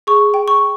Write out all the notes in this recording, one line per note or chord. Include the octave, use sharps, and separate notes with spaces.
G#4 C#6
G5
C#6